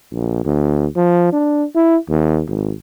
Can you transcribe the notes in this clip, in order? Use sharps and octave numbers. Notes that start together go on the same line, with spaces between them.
A#1
D2
F3
D4
E4
D#2
G#1